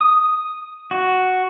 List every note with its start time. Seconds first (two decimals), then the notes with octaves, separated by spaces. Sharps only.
0.01 D#6
0.91 F#4